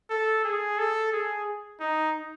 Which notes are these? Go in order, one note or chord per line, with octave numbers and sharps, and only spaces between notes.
A4
G#4
A4
G#4
D#4